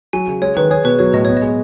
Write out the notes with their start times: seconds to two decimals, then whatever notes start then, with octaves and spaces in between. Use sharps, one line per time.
0.13 F#3 G#5
0.27 C#3
0.42 G#3 C#5
0.56 D#3 B4
0.70 G#4 C#5
0.84 B2 B4
0.99 F#3 C#5
1.13 A2 D#5
1.25 B3 C#5
1.37 D#5
1.42 G#3